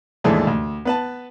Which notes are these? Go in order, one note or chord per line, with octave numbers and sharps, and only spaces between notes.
D#2 G#2 E3 G#3 A3 D4
D2
B3 B4 A5